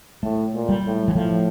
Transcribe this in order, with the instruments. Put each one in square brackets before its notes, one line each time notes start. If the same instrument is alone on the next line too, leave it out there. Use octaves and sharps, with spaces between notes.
[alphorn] A2 [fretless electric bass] A3
[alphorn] A#2
[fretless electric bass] G3
[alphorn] A2
[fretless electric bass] E3
[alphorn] A2 [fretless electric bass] F3